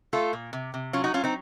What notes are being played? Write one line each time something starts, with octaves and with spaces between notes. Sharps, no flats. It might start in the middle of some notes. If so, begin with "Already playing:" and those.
A3 F4 A4
A#2
C3
C3
F#3 C#4 F4
D#4 F#4
F#3 C#4 F4
C4 D#4